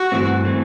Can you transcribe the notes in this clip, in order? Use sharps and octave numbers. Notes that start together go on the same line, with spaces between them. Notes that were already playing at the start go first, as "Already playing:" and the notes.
Already playing: F#4
G2 E3 A3 C4
E3 A3 C4